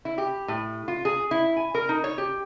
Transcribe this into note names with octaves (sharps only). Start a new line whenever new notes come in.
E4
G4
A2
F4
G#4
E4
G#5
A#4
D#4
C#5
G4